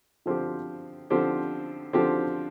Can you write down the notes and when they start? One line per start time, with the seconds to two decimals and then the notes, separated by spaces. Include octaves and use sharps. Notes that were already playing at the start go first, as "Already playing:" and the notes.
0.26 D3 F3 C4 G4
1.10 D3 F3 C4 G4
1.93 D3 F3 C4 G4